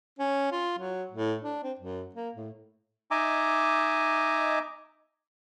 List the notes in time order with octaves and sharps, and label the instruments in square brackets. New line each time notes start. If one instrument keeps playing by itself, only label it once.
[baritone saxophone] C#4
F4
F#3
A2
D4
C4
F#2
A#3
A2
[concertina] D#4 D#5 E5 G#5 A#5 D6